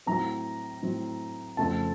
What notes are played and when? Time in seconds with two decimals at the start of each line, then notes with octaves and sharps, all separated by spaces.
0.06 A2 F#3 C4 A#5
0.82 A2 F#3 C4
1.57 F2 C#3 A3 C4 A5